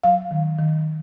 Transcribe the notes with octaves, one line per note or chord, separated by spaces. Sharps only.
F#3 F5
D#3
D#3